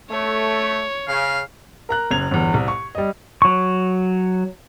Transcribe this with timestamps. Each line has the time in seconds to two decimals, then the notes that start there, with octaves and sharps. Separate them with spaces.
0.11 A3 C#5
1.08 C#3 F5
1.89 A#4 A#5 F#6
2.11 F#1 F#2 G#6 F7
2.31 G1 E2
2.54 C2
2.68 C#6
2.95 G3 D#5
3.42 F#3 C#6